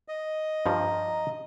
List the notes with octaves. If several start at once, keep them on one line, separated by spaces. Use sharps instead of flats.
D#5
G2 F3 G3 A#5